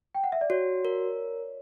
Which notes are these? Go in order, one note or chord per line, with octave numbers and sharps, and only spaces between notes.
G5
F#5
E5
D5
F#4 C#5
A#4